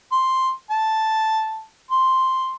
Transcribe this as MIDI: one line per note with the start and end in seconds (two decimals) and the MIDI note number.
0.12 0.51 84
0.70 1.64 81
1.91 2.55 84